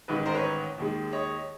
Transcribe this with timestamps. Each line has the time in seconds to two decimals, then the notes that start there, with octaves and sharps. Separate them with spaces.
0.08 A1 G#2 D#3 B4
0.26 A#4 C5
0.35 B4 C#5
0.78 D#2 D#3 G#3
1.13 C#5 D#5